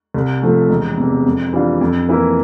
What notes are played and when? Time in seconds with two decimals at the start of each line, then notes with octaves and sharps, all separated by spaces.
0.14 C2
0.42 C3 F3 A3
0.69 E1
0.98 E2 C3
1.26 F2
1.53 E3 G3 D4 F4
1.81 F2
2.09 E3 A#3 E4